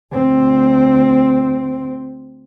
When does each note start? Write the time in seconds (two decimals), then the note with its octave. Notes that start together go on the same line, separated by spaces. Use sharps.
0.13 D2 C4